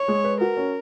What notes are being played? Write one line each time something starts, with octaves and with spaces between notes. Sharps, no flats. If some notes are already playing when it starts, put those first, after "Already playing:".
Already playing: C#5
G#3
B4
F#4 A#4
C#4